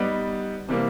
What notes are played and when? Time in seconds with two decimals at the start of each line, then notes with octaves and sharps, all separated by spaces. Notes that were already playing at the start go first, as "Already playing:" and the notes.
Already playing: G3 B3 D#4
0.69 C3 E3 G3 A#3